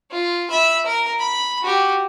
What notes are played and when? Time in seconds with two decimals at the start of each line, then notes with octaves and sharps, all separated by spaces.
0.11 F4
0.50 E5 B5
0.86 A#4
1.19 B5
1.62 F#4 G4